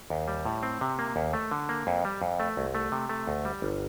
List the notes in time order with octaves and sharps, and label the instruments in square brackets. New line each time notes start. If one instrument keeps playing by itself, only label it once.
[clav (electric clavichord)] D#2
G3
A2
C4
C3
A#3
D#2
A3
D3
A#3
F2
G3
F2
A3
C2
A3
C3
A3
D2
G3
G1